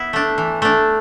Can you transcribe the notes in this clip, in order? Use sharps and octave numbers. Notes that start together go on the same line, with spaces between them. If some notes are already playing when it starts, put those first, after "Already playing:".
Already playing: B3 E4
A3 D4
E3
A3 D4